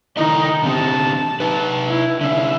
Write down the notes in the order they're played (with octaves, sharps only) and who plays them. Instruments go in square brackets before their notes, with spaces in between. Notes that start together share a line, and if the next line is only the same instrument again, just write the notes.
[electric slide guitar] D#3 E4 D#5 [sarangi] D#4
[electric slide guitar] D3 C4 G4 [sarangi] A5
[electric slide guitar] D#4 B4
[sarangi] E4
[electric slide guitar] D3 C#4 [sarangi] E5